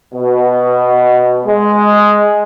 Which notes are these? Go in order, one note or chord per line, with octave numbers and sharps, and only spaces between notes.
B2
G#3